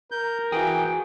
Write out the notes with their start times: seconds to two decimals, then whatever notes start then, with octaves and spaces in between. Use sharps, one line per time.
0.11 A#4 G6
0.52 E3 F#4 G#4 G5